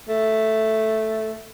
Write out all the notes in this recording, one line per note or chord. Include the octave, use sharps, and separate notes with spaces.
A3